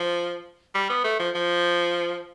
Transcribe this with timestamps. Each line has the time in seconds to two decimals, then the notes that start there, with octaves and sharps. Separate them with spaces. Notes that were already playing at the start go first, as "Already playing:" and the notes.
Already playing: F3
0.75 G3
0.90 B3
1.04 A3
1.20 F3
1.35 F3